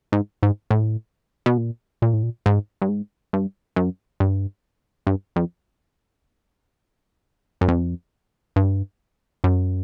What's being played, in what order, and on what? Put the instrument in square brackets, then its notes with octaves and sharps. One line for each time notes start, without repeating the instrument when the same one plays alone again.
[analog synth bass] G#2
G#2
A2
B2
A#2
A#2
A2
A#2
G#2
G2
G#2
G2
F#2
G2
G2
F2
F#2
F2
G2
F#2